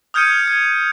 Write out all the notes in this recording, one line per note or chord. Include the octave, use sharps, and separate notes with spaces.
D#6 F6 G6 G#6 C#7 D#7
G#6